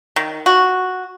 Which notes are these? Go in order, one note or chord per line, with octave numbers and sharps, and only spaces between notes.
D#3
F#4